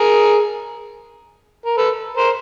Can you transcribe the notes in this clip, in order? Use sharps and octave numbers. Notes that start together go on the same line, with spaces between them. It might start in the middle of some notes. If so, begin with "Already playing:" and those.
Already playing: G#4 A#4
A#4
A4 B4
A#4 C5